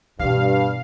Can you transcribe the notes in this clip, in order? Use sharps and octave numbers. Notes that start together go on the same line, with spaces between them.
G2 B2 E3 F5